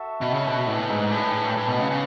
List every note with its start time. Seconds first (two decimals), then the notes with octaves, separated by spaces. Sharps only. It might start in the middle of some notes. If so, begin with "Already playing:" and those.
Already playing: F#4 A4 E5
0.21 B2
0.34 C#3
0.47 B2
0.67 A2 D4 G#4 B4
0.90 G#2
1.12 A2
1.57 A2
1.69 B2
1.80 C#3
1.90 C#3